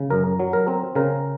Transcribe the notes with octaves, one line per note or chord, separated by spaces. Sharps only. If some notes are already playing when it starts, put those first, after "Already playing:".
Already playing: C#3
F#2 A#4
F#3
A#4
C4
C#3 A#4